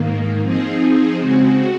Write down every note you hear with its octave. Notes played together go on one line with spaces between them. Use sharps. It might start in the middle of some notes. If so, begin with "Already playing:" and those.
Already playing: G#2 D#3 A#3
F3 C4 D#4 G#4
C#3 G#3 C4 F#4